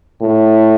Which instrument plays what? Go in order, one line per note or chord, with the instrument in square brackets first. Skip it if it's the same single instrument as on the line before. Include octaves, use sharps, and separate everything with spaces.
[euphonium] A2